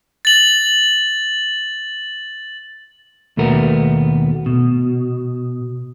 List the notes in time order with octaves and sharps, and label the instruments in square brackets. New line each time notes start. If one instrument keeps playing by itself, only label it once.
[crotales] A6 F#7
[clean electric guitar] D#2 B2 A3 B3 A#4
B2